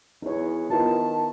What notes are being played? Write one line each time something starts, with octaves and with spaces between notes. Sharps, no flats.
E2 D#4 C#5
D#3 B3 E4 F4 A5